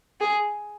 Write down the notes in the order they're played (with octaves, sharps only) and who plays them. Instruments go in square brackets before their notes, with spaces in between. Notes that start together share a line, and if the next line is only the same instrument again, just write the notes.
[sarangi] G#4